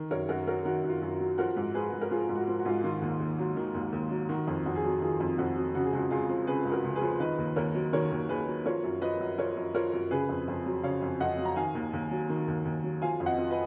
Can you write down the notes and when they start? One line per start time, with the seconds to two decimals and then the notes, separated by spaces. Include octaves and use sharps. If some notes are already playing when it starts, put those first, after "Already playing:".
Already playing: D#3
0.11 F#2 A#4 C#5
0.29 F#2 F#4 A#4
0.47 F#3 F#4 A#4
0.65 D#3 F#4
0.84 F#2
0.89 F4
1.02 F#2
1.14 F#4
1.20 F#3
1.38 F3 F#4 A#4
1.56 G#2
1.74 F3 G#4 B4
1.92 G#2
2.01 A#4
2.11 F3 F4 G#4
2.29 G#2
2.35 F#4
2.47 F3
2.60 F#4
2.65 G#2 F4
2.84 D#3 F4
3.02 D#2
3.20 D#2
3.39 F#3
3.56 D#3
3.74 D#2
3.93 D#2
4.11 F#3
4.29 D#3 F#4
4.47 F2
4.66 F2 F#4
4.76 G#4
4.84 F#3 F#4
5.02 D#3 F4 G#4
5.20 F2
5.38 F2 F#4
5.56 F#3
5.74 C#3 F#4
5.85 G#4
5.93 C#2 F#4
6.10 C#2 F4 G#4
6.29 F3
6.47 C#3 G#4 B4
6.65 C#2
6.72 F#4 A#4
6.84 C#2
6.96 G#4 B4
7.01 F3
7.20 D#3 B4 D#5
7.38 D#2
7.56 D#2 A#4 C#5
7.74 F#3
7.93 D#3 A#4 C#5
8.11 D#2
8.29 D#2 G#4 B4
8.47 F#3
8.66 F3 A#4 C#5
8.84 F#2
9.01 F3 B4 D#5
9.20 F#2
9.38 F3 A#4 C#5
9.56 F#2
9.74 F3 A#4 C#5
9.93 F#2
10.11 C#3 G#4 B4
10.29 F2
10.48 F2
10.66 F#3
10.83 C#3 C#5 F5
11.02 F2
11.20 F2 D#5 F#5
11.38 F#3
11.45 A#5
11.56 D#3 F5 G#5
11.75 D#2
11.93 D#2
12.11 F#3
12.29 D#3
12.48 D#2
12.65 D#2
12.84 F#3
13.02 F3 F5 G#5
13.20 F2
13.26 D#5 F#5
13.38 F3
13.51 B4 D#5